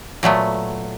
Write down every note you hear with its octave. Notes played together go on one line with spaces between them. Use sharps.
A#2 F#3 A3 B3